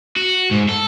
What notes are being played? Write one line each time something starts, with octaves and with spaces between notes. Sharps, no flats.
F#4
G#2
A4